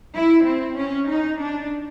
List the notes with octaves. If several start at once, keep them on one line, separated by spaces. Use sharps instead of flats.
E4
C4
C#4
D#4
D4